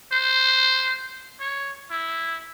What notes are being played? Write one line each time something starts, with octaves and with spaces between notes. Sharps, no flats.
C5
C#5
E4